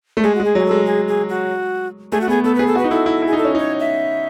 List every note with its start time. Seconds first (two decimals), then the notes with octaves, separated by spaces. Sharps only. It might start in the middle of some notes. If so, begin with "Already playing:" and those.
0.17 A3
0.23 G#3 G#4
0.35 F#4
0.40 G#3 G#4
0.55 F#3 G#4
0.66 G#3 A4
0.86 G#4
1.08 G#4
1.29 F#4
2.12 A3 G#4
2.21 F#4
2.28 B3 G#4
2.44 B3 A4
2.55 G#4 B4
2.67 A4
2.75 F#4 B4
2.84 D#4
2.91 E4 A4
3.06 E4
3.22 E4 G#4
3.33 D#4 A4
3.44 C#4
3.55 D#4 C#5
3.80 E5